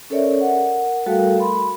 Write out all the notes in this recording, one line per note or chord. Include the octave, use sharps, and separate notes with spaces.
C#4 A4 A#4 C#5 D5 E5
A#4 F#5
G3 A3 F#4 A4 A#4 F5
B5 C6